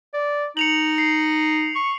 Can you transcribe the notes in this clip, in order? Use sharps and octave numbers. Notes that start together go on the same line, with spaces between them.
D5
D#4 C#7 F7 F#7
C7
C#6